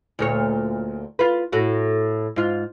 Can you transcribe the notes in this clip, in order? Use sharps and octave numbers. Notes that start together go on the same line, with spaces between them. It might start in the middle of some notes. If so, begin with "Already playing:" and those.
D2 A#2 C#5
F4 B4
A2 F#4
G#2 F4